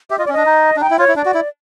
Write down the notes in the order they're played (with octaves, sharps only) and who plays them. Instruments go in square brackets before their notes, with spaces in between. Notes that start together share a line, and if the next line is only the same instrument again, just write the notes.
[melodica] G4 [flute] E5
[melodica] F4 [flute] D#5
[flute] D5
[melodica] C#4
[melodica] D4 [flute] D#5
[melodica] D#4
D4
[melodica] D#4 [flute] G5
[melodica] E4
[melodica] F4 [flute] C#5
[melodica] E4
[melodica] D4 [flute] D5
[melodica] F#4
E4